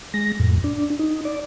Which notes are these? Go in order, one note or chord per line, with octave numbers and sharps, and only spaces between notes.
G#3 A#6
F2 A2
D4
D#4
D5